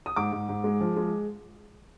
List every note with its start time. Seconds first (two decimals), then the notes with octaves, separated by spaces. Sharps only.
0.06 D#6
0.16 G#2 D6
0.32 G#2
0.49 G#2
0.64 G#3
0.81 F3
0.97 G#3